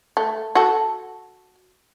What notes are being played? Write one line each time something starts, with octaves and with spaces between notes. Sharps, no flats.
A3
F#4 A4